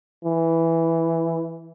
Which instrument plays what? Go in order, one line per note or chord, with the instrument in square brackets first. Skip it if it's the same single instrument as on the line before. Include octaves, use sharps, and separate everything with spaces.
[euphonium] E3